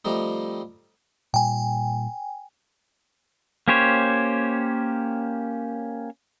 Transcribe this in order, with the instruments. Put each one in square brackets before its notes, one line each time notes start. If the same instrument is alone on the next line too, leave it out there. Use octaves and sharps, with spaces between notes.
[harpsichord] F3 G3 A3 C4 D#4
[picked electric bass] A#2 G3 [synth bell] G5 G#5
[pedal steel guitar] A#3 C#4 G4 C5 C#5